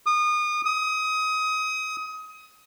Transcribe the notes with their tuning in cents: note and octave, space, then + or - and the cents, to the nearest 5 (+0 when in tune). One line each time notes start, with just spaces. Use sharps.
D#6 -30
D#6 +25